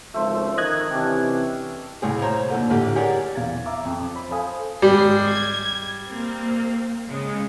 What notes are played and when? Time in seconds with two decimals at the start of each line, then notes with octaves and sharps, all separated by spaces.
0.14 G#1 C#2 F3 A3 C5 E5
0.58 D#3 D#5 F#6 G#6
0.91 C3 E3 C#4 D4 G5
2.02 C2 A2 G#4
2.22 C5 C#5 A#5
2.49 D#2 A#2 D3
2.70 A1 D3 G4
2.95 G4 G#4 A#4 C#5 D5 F#5
3.35 B1 E2 F5 G#6 A6
3.66 E5 F5 A#5 D6 E6
3.85 F2
4.15 C5 B5
4.31 A4 C5 F5 G#5 D#6
4.82 G#1 G3 G#3 C7
5.28 G#6
6.08 A#3 C4
7.09 C#3 G#3